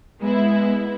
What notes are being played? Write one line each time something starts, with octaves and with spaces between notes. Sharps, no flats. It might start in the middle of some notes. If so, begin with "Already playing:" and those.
G#3 B3 E4